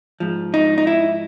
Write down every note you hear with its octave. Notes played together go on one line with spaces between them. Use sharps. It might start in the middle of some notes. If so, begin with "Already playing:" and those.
G#2 F3
D#4
D#4
E4